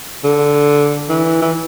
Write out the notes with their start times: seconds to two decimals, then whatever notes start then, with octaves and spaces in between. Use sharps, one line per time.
0.24 D3
1.09 E3
1.42 E3